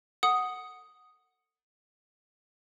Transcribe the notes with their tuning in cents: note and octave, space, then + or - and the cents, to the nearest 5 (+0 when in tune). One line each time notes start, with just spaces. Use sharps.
A4 +35 F#5 +0 D#6 +0